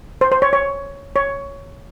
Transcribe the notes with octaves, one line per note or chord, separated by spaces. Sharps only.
C5
C5
C#5
C#5
C#5